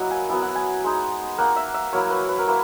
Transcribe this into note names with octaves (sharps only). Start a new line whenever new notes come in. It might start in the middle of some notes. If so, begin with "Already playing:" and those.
Already playing: F#3 A#3 E4 D#5 F#5
G#5
F#3 B3 E4 G#5
F#5
G#5
G#3 D#4
A#3 D#4 F#5
E5
E5
F#3 A#3 E4 C#5
B4
B4
A#4
A#3 E4 B4